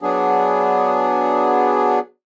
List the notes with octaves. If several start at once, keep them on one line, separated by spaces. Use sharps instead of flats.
F#3 B3 D4 G#4